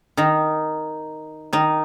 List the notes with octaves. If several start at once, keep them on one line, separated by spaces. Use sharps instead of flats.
D#3 D#4
D#3 D#4